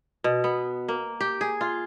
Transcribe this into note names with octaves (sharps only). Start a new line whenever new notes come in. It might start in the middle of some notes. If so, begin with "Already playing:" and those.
B2
B3
A#3
G4
G#4
F4